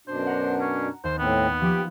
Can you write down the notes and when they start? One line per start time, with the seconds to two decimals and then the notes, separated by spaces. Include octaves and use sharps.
0.07 F#2 B2 D4 C5
0.27 F#5 A#5
0.61 C#4
1.04 D#2 C5
1.19 A2 B3 C4
1.61 F3 G4